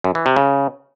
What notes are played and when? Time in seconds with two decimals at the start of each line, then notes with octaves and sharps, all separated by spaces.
0.04 F#2
0.15 E3
0.26 C3
0.36 C#3